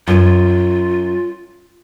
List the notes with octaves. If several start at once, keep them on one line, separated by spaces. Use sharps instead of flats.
F#2 F4